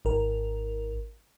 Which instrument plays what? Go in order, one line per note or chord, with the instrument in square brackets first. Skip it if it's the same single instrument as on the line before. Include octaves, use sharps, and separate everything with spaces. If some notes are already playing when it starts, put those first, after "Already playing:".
[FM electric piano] G#1 A#4